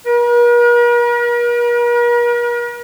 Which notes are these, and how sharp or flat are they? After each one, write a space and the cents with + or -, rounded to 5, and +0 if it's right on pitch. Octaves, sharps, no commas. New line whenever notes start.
A#4 +45